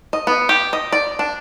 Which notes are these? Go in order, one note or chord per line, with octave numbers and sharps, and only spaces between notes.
D#5
B3
G4
D#5
D5
D4